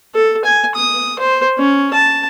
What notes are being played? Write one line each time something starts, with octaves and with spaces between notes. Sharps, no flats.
A4
G#5
D#6
C5
C#4
A5